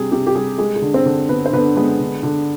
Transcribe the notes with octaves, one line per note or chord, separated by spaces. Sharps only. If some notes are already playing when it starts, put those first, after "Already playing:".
Already playing: C3 G3 G#4
C3 G4
G4
G3 G#4
G#3 G#4
G#4
D3
C4 C5
D3
D3 B3 B4
C5
D3 B3 B4
G#3 B3 B4
D3
D3